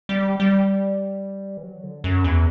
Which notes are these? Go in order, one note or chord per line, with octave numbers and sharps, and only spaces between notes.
G3
G3
E3
F#3
D3
F#2
E2